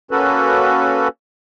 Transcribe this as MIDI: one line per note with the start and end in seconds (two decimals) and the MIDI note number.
0.11 1.08 58
0.11 1.08 61
0.11 1.08 66
0.11 1.08 69
0.11 1.08 71